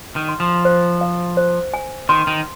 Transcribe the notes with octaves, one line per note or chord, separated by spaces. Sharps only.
D#3
C6
F3
C5
F5
C5
G#5
D#3 C6
D#3